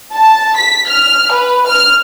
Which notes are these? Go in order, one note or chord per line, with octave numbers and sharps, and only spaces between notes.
A5
B6
F6
B4
F6